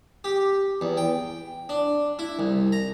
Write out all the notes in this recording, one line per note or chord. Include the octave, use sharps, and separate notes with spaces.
G4
E2
G5
D4
E4
C2
A#5